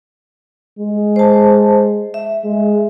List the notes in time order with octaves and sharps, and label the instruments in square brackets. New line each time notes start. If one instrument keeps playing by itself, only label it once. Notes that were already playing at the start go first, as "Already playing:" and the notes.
[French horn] G#3
[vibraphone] C5 A5
E5
[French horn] G#3